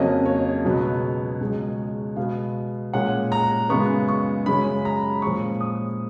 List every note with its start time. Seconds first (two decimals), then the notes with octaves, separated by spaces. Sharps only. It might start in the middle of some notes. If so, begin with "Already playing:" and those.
Already playing: F2 C#3 F#3 A#3 C#4 D#5
0.26 C#5
0.65 C#2 B2 F#3 B3
1.41 C#2 B2 G#3
2.16 B2 G#3 B3 F5
2.93 A#2 G#3 C#4 F#5
3.32 A#5
3.69 F#2 C#3 G#3 B3 C#6
4.09 C#6
4.46 F#2 C#3 G#3 C#4 B5
4.85 A#5
5.22 A#2 F3 G#3 C#4 C#6
5.60 D#6